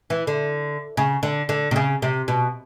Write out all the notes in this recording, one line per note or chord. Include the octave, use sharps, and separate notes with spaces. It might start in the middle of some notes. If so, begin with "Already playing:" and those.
E3
D3
C#3
D3
D3
C3
C#3
C3
B2